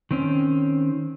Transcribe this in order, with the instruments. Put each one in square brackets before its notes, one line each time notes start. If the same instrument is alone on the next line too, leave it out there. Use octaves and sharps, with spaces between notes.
[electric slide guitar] D#3 C4 C#4